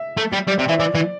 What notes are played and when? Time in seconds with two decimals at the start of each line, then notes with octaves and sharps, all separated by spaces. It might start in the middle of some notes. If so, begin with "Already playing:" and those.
Already playing: E5
0.17 A3
0.33 G3
0.48 G3 D5
0.58 C3 C5
0.69 E3 E5
0.80 E3 D5
0.95 E3